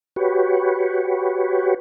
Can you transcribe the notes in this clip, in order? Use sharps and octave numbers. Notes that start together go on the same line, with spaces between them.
F#4 G4 B4 C#5